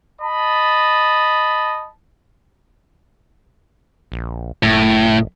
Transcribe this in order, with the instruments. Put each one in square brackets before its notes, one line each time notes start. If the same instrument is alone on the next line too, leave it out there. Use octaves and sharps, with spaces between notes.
[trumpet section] D#5 A5 B5
[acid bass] A#1
[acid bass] F#1 [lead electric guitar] A2